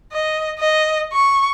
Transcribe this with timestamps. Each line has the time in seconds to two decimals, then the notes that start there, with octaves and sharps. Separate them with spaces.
0.12 D#5
0.59 D#5
1.12 C#6